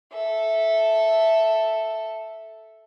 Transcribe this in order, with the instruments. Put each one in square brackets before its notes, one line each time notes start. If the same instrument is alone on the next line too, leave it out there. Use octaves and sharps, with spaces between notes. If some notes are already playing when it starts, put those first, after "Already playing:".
[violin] A4 E5